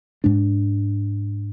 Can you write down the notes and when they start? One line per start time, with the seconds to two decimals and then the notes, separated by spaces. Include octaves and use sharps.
0.24 G#2 G#3 D4